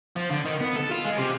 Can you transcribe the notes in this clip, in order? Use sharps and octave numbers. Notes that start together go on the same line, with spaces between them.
F3
D3
D#3
B3
A4
F4
G#3
C3